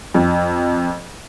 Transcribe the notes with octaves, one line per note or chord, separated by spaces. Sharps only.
F2